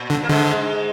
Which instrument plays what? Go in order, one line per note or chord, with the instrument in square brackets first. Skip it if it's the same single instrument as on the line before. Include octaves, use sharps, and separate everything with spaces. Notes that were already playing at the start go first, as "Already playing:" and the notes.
Already playing: [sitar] A#2
[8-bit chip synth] D3
[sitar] A#3
[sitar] G#2 G#3 [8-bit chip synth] D3